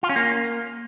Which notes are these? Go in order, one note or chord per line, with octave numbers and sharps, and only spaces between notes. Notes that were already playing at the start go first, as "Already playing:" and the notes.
F4
C#4
A#3